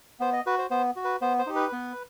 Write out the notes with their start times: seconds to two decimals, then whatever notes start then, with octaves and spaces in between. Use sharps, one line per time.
0.20 B3 C5
0.33 D#5
0.46 F#4 B4
0.58 C5
0.70 B3 C5
0.96 F#4
1.05 B4
1.21 B3 C5
1.39 C5
1.47 D#4 G4
1.56 B4
1.72 B3